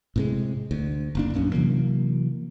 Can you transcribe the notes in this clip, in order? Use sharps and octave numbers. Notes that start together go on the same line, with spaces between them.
A2 C3 G#3
D2
F#1 A#3 D4
A#1 F#2 A#3 C#4
C3 E3 F#3 A#3